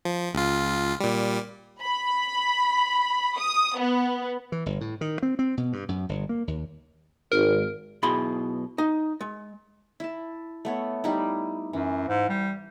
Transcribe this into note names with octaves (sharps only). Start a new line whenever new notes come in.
F3
C#2 F4
A#2 G3
B5
D#6
B3
E3
G1
A2
D#3
C4
C4
B2
G2
F#2
G1
A#3
D#2
G#1 A#4
B1 B2 E4 G#4 B5 C6
D#4
G#3
E4 A5
A3 B3 C#5
G3 D#4 E4
F#2 E3
G#2
G3